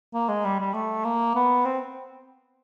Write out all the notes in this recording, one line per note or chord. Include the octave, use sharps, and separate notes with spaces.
A#3
G#3
G3
G3
A3
A#3
B3
C4